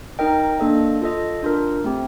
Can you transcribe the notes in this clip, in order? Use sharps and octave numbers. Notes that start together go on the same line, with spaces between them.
D#4 A#4 D#5 G5
A#3 D4 A4 D#5
F4 A4 D#5
D4 F4 A#4
A3 C4 G4